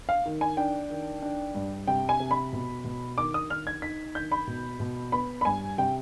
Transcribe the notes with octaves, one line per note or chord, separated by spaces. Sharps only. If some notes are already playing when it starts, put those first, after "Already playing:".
F5
D#3
G#5
D4 G5
D#3
D4
G2
C3 G5
G#5
C3
B5
B2
B2
D#3 D6
D#6
D#3 F6
G#6
D#4 B6
D#3 G6
B5
B2
B2
B3 B5
B5
G2 G#5
C3 G5